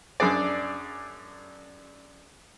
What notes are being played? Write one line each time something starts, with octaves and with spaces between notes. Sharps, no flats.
F#2 D4 G#4 D5